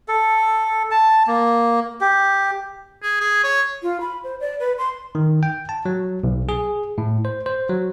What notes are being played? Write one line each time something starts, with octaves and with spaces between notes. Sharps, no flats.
A4
A5
A#3
G4
G#4
G#4
C#5
F4
B5
C5
D5
B4
C6
D#3
G5
A5
F#3
B1
G#4
A2
C5
C5
F#3